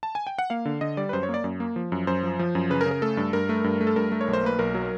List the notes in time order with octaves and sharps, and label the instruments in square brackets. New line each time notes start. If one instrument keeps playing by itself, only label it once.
[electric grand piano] A5
G#5
G5
F#5
A#3 F5
D3
D3 D#5
G3 D5
B4
F#2 C5
C#5
A#3 D5
F#2
A#3
F3
F#2
F#2 C5
F3
F3
F#2
C#3 B4
A#4
C#3
A#4
A3 A4
G2
G2 A#4
A3
G2
A3
A4
G2 A#4
A3
C#5
B1
C5
A#3 B4
B1 A#4
F#3